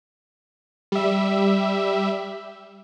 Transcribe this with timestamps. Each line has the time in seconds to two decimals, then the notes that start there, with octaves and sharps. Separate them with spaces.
0.92 G3 E5